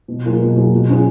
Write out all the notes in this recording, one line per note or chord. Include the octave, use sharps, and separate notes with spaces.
B2
F#3 A#3 F4 G#4
B2
F#3 A#3 F4 G#4
B2
F#3 C#4 F4 G#4